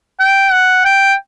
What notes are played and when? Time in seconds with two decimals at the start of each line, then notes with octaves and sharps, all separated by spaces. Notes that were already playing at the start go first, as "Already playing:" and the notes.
0.20 G5
0.52 F#5
0.85 G5